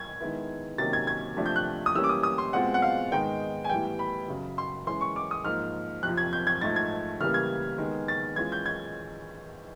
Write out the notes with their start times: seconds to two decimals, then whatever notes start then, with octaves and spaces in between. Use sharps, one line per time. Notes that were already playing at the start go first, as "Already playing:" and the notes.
Already playing: G#6
0.20 D#3 G#3 B3 E4
0.78 C3 D#3 F#3 A#3 C#4 A6
0.93 G#6
1.07 G#6
1.37 C3 F3 A3 D4
1.46 G6
1.56 F#6
1.86 D#6
1.95 E3 G3 A#3 C#4 E6
2.04 D6
2.09 D#6
2.23 D#6
2.38 C6
2.53 B2 G#3 C4 F4 F#5
2.74 F#5
2.82 F5
3.12 G#2 D#3 G#3 B3 D#4 G5
3.64 G#5
3.69 A2 E3 G3 B3 G5
3.99 B5
4.28 F#2 C#3 F#3
4.58 C6
4.87 E3 G#3 C#4 C6
5.01 C#6
5.16 D6
5.31 D#6
5.45 G#2 F3 A#3 F6
6.03 F2 C3 F3 F#6
6.17 G#6
6.33 G6
6.47 G#6
6.61 G#2 F3 A3 A6
6.76 G#6
7.20 C#3 E3 G3 A#3 F6
7.34 G#6
7.78 D#3 G#3 B3
8.08 A6
8.36 E3 G#3 C#4 F4 G#6
8.52 G6
8.66 G#6